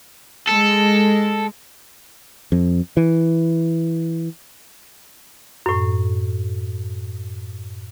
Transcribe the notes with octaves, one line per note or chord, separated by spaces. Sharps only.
G#3 A4
F2
E3
F#2 A2